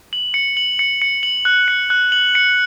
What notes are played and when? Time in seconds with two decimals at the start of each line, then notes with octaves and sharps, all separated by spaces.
0.13 F#7
0.34 C#7
0.57 F#7
0.79 C#7
1.02 C#7
1.23 F#7
1.45 F#6
1.68 C#7
1.90 F#6
2.12 F#7
2.35 C#7